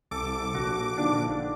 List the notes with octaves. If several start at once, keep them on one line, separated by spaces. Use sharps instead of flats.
C2 A4 D6
A#1 F#4
D3 D#3 F3 D4